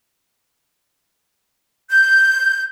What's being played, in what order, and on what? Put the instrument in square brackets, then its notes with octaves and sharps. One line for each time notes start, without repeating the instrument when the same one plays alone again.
[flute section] G6